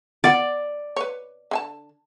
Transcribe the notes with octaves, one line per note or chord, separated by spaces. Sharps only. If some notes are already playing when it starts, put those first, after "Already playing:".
B3 D5 F#5
B4 C#5
D3 G#5 A5